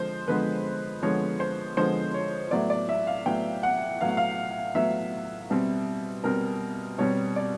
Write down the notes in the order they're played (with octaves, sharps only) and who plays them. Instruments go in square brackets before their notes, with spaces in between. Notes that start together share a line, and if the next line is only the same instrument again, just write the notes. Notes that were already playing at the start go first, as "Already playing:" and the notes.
Already playing: [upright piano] D3 F3 G#3 C5
D3 F3 G#3 B3 B4
D3 F3 G#3 B3 C#5
C5
D3 F3 G#3 B3 C5
C#5
A2 F#3 B3 D5
D5
E5
F5
A2 F#3 B3 G5
F#5
A2 F#3 B3 F5
F#5
F5
A2 F#3 B3 E5
B2 G3 C4
B2 G3 C4 A#4
B2 G3 C4 C#5
D5